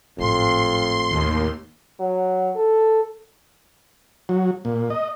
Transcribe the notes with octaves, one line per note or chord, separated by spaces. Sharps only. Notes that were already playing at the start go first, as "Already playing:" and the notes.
G#1 F2 A2 C6
D#2
F#3
A4
F#3
A#2
D#5